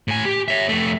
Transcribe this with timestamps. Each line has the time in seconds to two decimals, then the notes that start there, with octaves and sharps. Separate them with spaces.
0.08 A2 G#5
0.25 G4
0.48 C#5 E5
0.69 F2 A3